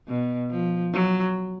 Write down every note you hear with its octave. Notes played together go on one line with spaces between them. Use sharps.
B2
F3
F#3